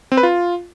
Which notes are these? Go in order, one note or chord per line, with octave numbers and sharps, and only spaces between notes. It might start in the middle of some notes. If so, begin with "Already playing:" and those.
C4
B4
F4